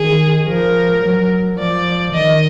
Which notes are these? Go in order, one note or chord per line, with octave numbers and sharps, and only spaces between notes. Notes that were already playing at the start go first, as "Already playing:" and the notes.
Already playing: D#3 G#4
F3 A#4
F#3
F3 D5
D#3 D#5